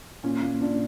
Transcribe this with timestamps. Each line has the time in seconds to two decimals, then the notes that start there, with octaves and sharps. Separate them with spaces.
0.23 A#2 C#4
0.42 A#2
0.61 A#2 D4